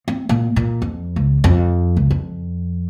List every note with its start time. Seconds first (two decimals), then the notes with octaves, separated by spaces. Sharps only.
0.08 C4
0.29 A#2
0.56 A#2
0.82 F2
1.16 C#2
1.44 F2
1.97 C#2
2.11 F2